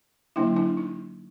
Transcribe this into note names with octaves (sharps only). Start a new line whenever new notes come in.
D3 F#3 A#3 D4 E4
D4 E4
D#4